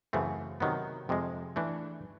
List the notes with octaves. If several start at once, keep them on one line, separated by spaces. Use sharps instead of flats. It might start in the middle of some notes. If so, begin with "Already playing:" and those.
F#2 C#3 E3 A3 C4
C3 D#3 F#3 B3
F2 C3 F3 G#3
E3 A3 D4